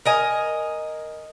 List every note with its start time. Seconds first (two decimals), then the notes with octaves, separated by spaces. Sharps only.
0.05 A#4 D#5 G#5